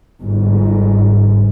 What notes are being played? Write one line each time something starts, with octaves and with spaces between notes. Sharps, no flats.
G1 G#2